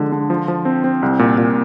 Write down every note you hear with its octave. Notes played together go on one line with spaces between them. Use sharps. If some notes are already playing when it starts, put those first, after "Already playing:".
Already playing: D3 F3 G#3
D3
F3
F3
C4
C4
C2
A#2
A#2